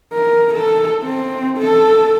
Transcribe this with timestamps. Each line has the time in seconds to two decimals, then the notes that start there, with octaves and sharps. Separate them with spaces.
0.13 A#4
0.54 A4
1.04 C4
1.59 A4